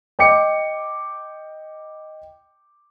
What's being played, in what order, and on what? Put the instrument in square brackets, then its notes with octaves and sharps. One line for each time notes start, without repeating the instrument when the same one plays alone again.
[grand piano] D#5 G5 D6 C#7